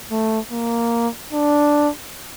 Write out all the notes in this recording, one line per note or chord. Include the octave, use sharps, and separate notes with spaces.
A3
A#3
D4